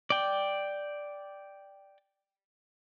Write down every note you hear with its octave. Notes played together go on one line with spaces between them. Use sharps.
D5 G5